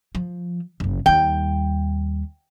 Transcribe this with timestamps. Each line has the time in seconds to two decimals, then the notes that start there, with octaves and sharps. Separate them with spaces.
0.15 F3
0.80 F#1 C#3
1.06 D#2 G3 G5